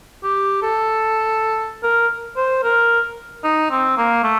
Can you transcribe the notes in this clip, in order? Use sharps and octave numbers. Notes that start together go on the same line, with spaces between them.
G4
A4
A#4
C5
A#4
D#4
C4
A#3
A3